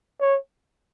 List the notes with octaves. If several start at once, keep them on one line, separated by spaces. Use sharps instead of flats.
C#5